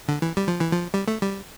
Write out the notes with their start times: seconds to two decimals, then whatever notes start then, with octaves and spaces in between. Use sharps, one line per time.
0.08 D3
0.22 E3
0.37 G3
0.48 F3
0.60 E3
0.72 F3
0.94 G3
1.08 A3
1.22 G3